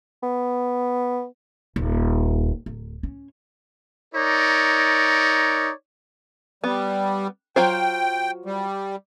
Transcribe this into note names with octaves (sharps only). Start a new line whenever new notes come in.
B3
D#1
D1
C#4
D#4 A#4 C#5 D5
G3 B3
F#3 F4 C5 G5
G3